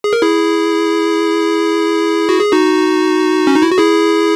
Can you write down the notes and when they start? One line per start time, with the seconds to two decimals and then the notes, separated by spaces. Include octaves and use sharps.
0.04 G#4
0.13 A#4
0.22 E4 G#4
2.29 F#4
2.40 G#4
2.53 D#4 F#4
3.47 C#4
3.55 D#4
3.62 E4
3.71 F#4
3.78 E4 G#4